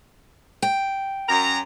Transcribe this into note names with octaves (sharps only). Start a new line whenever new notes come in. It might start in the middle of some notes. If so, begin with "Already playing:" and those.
G5
F#2 A#5